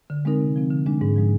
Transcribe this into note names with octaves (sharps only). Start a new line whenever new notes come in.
D3
G#3 C4 D#4 A#4
C3
F3 C4
D3
G#3 D4
G#2
F3 G#3 D#4